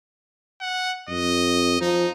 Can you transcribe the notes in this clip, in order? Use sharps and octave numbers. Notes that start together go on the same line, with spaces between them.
F#5
F2 D#5
F3 D#4